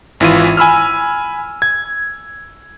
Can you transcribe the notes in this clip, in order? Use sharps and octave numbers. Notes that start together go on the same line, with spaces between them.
G#1 E3 E4 F4 D#7
G#5 B5 E6 F6
G#6